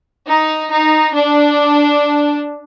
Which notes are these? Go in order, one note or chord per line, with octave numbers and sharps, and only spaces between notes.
D#4
D#4
D4